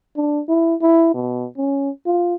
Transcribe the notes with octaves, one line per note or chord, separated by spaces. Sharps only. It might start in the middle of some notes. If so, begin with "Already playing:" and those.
D4
E4
E4
B2
C#4
F4